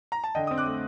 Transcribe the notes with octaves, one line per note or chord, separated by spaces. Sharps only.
A#5
A5
D3 D#5 G5
C4 D#6
D6 F#6
A3